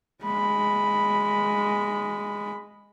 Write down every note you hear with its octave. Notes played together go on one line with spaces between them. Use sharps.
G#3 B5